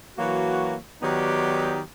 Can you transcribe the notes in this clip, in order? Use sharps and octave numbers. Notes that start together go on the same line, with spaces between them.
E3 F#3 A#3 F#4
D#3 F#3 B3 D#4 G4 D5